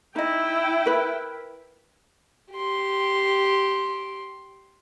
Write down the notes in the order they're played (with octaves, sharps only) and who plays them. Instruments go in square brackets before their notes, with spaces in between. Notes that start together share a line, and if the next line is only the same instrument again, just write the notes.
[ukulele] D#4 D#5 [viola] E4 G5
[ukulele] A#4 B4
[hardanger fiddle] G4 C6